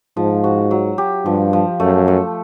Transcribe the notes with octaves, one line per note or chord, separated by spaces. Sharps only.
G#2 F3
F#4
F#3
G4
G2 F3
F3
F#2 A3
A3